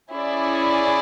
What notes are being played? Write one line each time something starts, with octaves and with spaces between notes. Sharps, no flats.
C#4 E4 G#4 D5